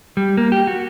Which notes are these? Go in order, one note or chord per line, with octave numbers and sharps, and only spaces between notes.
G3
A#3
G4
F#4